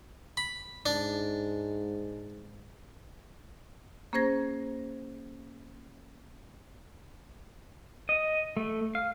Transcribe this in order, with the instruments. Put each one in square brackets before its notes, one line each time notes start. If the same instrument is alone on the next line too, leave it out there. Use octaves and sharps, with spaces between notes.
[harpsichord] B5
[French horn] G#2 [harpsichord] D4
[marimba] A#3 C#4 G#4 C5 G#6 A#6
[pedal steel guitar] D#5
A3
F5